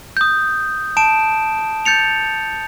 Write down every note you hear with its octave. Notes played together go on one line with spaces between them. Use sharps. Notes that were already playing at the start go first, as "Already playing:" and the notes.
D#6 G6
A5 D7 E7
G6 A6 C#7 F7